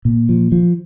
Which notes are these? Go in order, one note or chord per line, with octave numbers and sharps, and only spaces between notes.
A#2
F3
F3